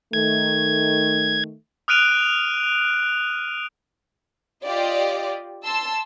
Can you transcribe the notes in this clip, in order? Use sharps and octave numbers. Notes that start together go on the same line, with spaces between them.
D#3 A3 G#6
D#6 F6 F#6 D7 D#7 F7
F4 G4 D5 D#5
A5 C6 E6